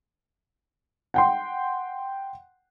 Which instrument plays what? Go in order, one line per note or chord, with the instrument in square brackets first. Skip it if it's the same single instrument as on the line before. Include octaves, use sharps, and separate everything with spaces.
[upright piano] F#5 G5 C6